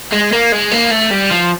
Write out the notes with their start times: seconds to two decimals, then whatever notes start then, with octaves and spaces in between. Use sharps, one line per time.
0.13 G#3
0.33 A#3
0.52 G#3
0.72 A#3
0.91 A3
1.11 G3
1.31 F3